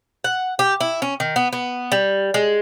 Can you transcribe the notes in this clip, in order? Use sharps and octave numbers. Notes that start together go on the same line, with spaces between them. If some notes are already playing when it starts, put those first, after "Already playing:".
F#5
G4
E4
C#4
D#3
B3
B3
G3
G#3